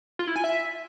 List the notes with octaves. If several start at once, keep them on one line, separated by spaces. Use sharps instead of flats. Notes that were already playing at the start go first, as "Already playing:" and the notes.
F4
E4
G#5
E5